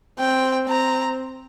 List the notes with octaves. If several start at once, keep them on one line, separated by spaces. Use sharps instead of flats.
C4 G5
C4 A#5